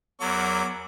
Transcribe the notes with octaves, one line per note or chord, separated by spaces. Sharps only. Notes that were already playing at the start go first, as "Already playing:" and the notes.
E2 F#3 F#4 A#4 D6